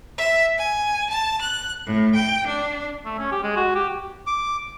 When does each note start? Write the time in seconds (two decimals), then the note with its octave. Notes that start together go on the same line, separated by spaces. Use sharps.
0.18 E5
0.58 G#5
1.10 A5
1.42 F#6
1.86 A2
2.15 G5
2.46 D4
3.05 A3
3.18 C#4
3.32 G4
3.44 G#3
3.56 F#4
3.75 G4
4.27 D6